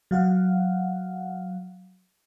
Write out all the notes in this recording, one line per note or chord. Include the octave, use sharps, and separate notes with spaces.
F#3 F5 F#5